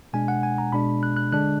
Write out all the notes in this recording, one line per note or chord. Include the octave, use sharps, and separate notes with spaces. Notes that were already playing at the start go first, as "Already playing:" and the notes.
B2 G#3 D4 G#5
F#5
G#5
A#5
B2 G#3 D4 B5
F#6
F#6
D3 G#3 D4 F#6